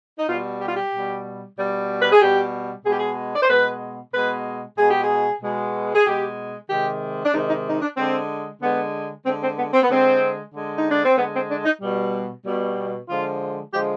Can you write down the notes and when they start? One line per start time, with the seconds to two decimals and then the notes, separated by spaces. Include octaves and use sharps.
0.19 D#4
0.29 B2 G3 F4
0.61 G4
0.68 F4
0.76 G4
0.94 B2 G3
1.58 B2 G3
2.02 B4
2.12 G#4
2.21 B2 G3 G4
2.85 B2 G#4
2.88 G#3 G4
2.99 G#4
3.35 D5
3.42 C5
3.49 B2 G#3 B4
4.13 B2 G#3 B4
4.78 B2 G#3 G#4
4.91 G4
5.04 G#4
5.41 B2 G#3
5.95 G#4
6.06 B2 G#3 G4
6.69 C3 D#3 G#3 G4
7.25 D4
7.34 C3 D#3 G#3 D#4
7.49 D#4
7.69 D#4
7.81 D4
7.97 D3 G#3 C4
8.61 D3 G#3 B3
9.26 D3 G#3 C4
9.42 C4
9.58 B3
9.73 C4
9.83 B3
9.89 D3 G#3 C4
10.54 D3 G#3
10.78 D#4
10.91 D4
11.05 C4
11.17 D3 G#3 B3
11.34 C4
11.49 D4
11.65 D#4
11.81 B2 G3
12.46 B2 G3
13.09 D3 F3 G#3 F4
13.74 D3 F3 G#3 G4